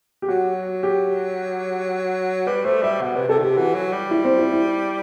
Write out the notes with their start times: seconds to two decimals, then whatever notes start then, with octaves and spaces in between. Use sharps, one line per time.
0.22 G4
0.28 F#3 F#4
0.83 G4
2.47 G3 B4
2.64 A3 C5
2.83 G3 E5
3.01 B2 F#5
3.16 C3 B4
3.28 C3 A4
3.39 D#3
3.43 C3 G4
3.57 E3 F#4
3.74 F#3
3.93 G3
4.11 E4
4.24 C4
4.39 E4
4.53 E4